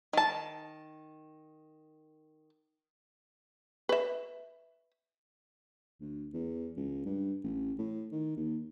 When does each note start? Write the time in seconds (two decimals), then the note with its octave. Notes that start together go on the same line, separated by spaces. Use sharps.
0.13 D#3 A5
3.89 B4 E5
6.00 D2
6.33 E2
6.77 C#2
7.05 G2
7.44 A1
7.78 A2
8.12 D#3
8.36 D#2